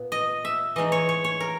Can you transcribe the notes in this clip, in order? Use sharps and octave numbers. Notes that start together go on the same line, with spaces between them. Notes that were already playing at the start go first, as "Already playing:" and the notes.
Already playing: A#2 B3
D#5
E5
E3 G#3 D#4 D#5
C#5
C#5
C#5
A#4